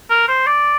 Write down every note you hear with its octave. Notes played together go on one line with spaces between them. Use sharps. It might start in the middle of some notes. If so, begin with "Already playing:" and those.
A#4
C5
D5